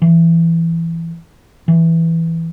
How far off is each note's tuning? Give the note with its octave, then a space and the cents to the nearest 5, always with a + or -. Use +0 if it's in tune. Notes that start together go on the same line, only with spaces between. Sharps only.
E3 +15
E3 +0